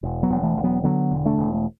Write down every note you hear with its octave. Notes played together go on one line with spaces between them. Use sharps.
E1
F#3 B3
E1
E3 A3
D2
F#3 B3
D3 F#3 B3
E1
A3 D4
E1
A3